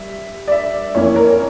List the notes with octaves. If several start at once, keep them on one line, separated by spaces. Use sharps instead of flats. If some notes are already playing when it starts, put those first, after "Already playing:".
Already playing: G3 E5
D5
E5
F2 E3 A#3 C#4 C#5
A#4